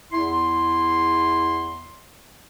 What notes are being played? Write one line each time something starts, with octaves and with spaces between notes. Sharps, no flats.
E2 E4 C6